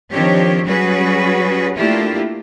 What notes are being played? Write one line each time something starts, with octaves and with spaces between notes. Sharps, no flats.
D#3 F3 C4 D4 G4 C#5
F#3 G3 C#4 F#4 G#4 B4
A3 A#3 D4 E4 F4 G4